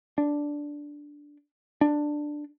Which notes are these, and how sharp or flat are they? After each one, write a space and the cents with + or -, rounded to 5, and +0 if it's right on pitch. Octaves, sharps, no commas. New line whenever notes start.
D4 -5
D4 +10